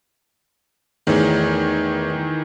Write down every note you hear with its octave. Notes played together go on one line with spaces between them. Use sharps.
E2 A2 D#3 E3